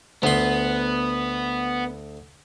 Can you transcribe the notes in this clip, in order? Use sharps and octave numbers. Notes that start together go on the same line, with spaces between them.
D2 B3 C6